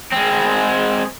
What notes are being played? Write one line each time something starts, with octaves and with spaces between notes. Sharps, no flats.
G#3 C4